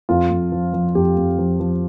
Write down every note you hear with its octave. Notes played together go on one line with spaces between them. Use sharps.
F2 F4
F2
F3
F3
F2 G4
F2
F3
F3